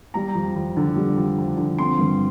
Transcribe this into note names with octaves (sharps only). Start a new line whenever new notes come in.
G3 A#5
F2
F2
D3
G3
F2
F2
D3
C4 C6
G2